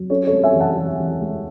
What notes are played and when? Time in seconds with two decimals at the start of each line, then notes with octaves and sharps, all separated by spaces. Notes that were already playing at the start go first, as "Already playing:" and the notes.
Already playing: F#3
0.10 C#4 A4 C#5
0.27 A4 C#5
0.33 G#3
0.44 E5 G#5
0.55 E3
0.60 F#5 A5
0.77 E3
1.00 E3
1.22 G#3